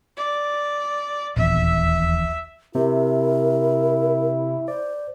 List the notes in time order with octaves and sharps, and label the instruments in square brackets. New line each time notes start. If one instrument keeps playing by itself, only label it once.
[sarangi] D5
[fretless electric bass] D#1 A#1 E2 [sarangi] E5
[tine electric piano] C3 [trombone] E4 [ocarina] A#4
[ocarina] C5 [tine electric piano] D5